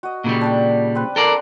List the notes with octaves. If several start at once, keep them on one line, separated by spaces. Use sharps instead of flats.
F#4 D#5
A#2 C#3 G3
D4 D5 G5
C4 B4
A4 A#4 D5